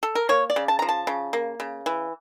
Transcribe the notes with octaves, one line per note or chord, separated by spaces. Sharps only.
A4
A#4
A#3 C#5
D5
C#3
A5
F3 A#5
A5
C#3
A#3
C#3
E3